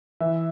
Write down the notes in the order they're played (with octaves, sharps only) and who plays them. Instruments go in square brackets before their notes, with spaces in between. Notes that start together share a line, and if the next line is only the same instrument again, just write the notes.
[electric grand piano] E3 E5